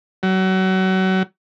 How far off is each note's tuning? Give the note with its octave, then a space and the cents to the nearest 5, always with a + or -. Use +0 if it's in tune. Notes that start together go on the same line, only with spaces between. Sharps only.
F#3 +30